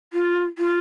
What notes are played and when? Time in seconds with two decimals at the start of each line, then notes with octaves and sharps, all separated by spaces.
0.13 F4
0.58 F4